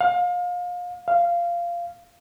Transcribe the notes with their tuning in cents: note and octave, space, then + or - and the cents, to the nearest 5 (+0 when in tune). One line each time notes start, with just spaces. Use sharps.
F5 +30
F5 -15